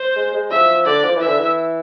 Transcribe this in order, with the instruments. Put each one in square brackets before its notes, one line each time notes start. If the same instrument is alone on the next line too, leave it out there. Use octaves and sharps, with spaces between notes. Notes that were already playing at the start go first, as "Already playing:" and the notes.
Already playing: [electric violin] C5
[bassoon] G#3
G#3
[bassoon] F3 [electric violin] E5
[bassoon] D3 [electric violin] D5
[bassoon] F3
E3
[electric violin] E5
[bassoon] D3
E3